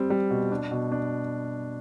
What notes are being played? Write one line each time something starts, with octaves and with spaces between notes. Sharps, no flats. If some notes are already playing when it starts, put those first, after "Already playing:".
Already playing: G3 C4
G3
B2
D4
B2
D4